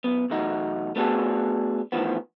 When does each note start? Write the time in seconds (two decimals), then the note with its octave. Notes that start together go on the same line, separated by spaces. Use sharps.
0.04 F#2 B3
0.30 B1 E2 A3 D#4 F#4
0.96 A3 B3 D4 F#4 G#4 A4
1.92 E2 A2 D#3 F3 B3